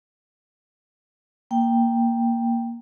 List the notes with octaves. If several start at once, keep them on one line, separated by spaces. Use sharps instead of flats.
A#3 G5